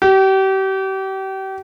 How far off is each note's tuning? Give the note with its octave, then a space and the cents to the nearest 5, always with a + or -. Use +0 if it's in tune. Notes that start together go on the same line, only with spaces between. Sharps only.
G4 -35